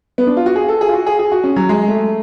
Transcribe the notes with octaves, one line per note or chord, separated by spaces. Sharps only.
B3
D4
F4
F#4
G#4
A4
G#4
F4
F#4
G#4
G#4
F#4
C#4
F#3
G#3
A3